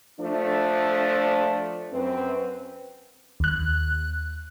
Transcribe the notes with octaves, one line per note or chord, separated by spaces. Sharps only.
F3 A3 D4
F#2 C4 B4
D#2 F#6